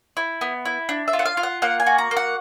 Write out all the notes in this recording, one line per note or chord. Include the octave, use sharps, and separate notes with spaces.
E4
B3
E4
D4
E5
F4
F#5
F5
F4
F#5
A#3 F#5
G#5
F#4
A#5
A#3
F#5